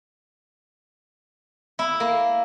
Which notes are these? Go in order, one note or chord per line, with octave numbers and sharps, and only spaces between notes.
E4
A#3